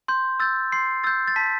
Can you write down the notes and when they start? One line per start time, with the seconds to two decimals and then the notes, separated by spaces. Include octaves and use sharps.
0.08 C6 G6
0.40 E6 G6 A6
0.72 C6 C7
1.04 E6 G6 A6
1.27 A6
1.36 A5 B6